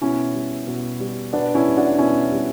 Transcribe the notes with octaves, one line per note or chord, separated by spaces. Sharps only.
B2 C#4 E4
G3
B2
G3
B2 B3 D4
C#4 E4
G3
D4 F#4
B2 C#4 E4
G3